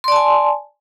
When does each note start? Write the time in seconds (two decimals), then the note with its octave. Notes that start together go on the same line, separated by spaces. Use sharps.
0.04 C6
0.08 D5
0.12 A5
0.16 G#5